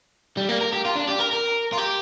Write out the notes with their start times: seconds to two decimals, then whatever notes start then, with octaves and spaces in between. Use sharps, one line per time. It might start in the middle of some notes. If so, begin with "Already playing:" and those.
0.37 G3
0.49 A#3
0.61 A#4
0.72 G4
0.85 F4
0.95 D4
1.07 G4
1.19 A#4
1.32 A#4
1.73 F4
1.78 G4